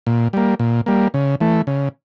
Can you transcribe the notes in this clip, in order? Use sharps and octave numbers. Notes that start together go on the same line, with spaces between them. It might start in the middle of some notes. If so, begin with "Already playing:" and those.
A#2
G3 A#3
A#2
G3 A#3
C#3
E3 A3
C#3